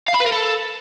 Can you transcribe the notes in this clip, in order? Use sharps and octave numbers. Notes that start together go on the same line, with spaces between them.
F5
B5
B4
A#4
A4